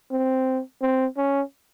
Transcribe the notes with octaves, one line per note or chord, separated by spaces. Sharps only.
C4
C4
C#4